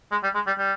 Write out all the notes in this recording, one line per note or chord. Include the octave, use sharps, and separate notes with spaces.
G#3
G3
G#3
G3
G3